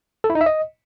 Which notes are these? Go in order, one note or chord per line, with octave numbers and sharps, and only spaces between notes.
A4
E4
D#4
E5
D#5